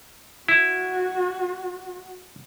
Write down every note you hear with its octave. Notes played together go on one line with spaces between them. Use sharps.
E4 F#4